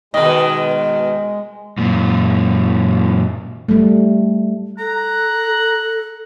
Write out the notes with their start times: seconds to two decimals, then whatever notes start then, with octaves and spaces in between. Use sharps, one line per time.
0.14 B2 D#3 G#3 D#5
1.78 F#2 A#2
3.69 G3 A3
4.79 A4 A#5 F#6